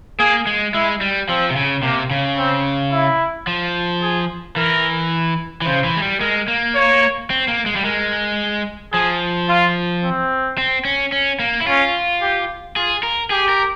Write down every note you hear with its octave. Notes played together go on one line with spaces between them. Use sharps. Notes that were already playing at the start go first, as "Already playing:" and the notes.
A#3 G#4
G#3
G#3 E4
G3
F3 C4
C3
C#3
C3 A#3
C#3
C4
E4
F3
G#4
E3 A#4
E3
C#3 C5
E3
G#3
G3
G#3 A#4
A#3
C#5
C4
A#3
G#3
G3
G#3 A#4
F3 G#4
F4
C4
C4
C#4
C#4
A#3
E4
C#4 F4
G4
F4 G#4
A#4
G4 G#4
A#4